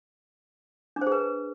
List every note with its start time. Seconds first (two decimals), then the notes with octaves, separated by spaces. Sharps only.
0.96 D4
1.01 C5
1.07 G#4
1.12 B4